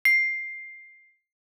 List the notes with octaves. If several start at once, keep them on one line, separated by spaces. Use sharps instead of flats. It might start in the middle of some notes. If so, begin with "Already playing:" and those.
C7